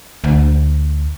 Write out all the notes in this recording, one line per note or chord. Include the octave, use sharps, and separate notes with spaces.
D2